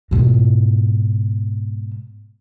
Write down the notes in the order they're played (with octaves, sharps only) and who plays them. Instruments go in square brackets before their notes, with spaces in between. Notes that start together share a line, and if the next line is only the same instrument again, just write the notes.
[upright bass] G#2 B2